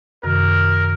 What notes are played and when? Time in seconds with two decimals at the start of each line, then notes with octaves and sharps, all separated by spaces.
0.23 F#2 C3 D#3 A#4